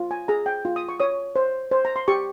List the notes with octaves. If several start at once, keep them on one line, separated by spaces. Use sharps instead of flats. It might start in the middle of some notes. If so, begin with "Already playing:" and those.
Already playing: F4
G#5
G#4 A#5
G5
F4
D#6
C#6
C#5 D#6
C5
C5
A#5
C6
G4 C#6